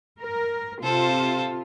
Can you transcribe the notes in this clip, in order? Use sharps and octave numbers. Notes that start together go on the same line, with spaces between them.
A#4
C3 F4 A4 C5